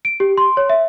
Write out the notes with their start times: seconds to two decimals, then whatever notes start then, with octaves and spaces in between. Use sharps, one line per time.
0.05 D7
0.20 G4
0.38 C6
0.57 C#5
0.70 E5